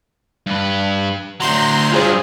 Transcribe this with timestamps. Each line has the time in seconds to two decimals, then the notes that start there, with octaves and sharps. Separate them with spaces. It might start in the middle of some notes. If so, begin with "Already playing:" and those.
0.46 G2 B4
1.40 D2 F#3 A#5 C6 G6
1.91 G2 F#3 F4 G#4 C5